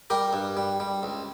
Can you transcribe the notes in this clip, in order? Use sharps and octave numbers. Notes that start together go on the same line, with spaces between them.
G3 G4 A#4
G2
G3
G3
C#2